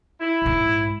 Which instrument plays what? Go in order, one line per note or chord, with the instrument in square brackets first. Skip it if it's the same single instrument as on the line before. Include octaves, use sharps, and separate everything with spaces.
[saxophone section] E4
[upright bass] A#1 G#2